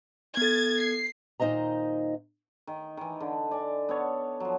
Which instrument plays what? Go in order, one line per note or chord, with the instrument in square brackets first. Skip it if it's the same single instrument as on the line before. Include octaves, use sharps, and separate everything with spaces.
[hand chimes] B3 A4 [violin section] G#6 A6
[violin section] C7
[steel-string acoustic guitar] D#2 A#2 D#4 C5 D#5 A#5
[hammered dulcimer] D#3
D#3 E3
D3
D5 G#5
B3 A4 C#5
F3 F#3